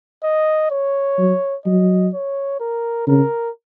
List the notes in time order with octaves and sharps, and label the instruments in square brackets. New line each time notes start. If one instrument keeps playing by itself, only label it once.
[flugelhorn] D#5
C#5
[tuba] F#3
[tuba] F#3 [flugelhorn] D#5
[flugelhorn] C#5
A#4
[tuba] C#3 [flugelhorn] A#4